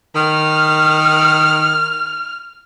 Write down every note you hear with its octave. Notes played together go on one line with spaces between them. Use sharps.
D#3 F6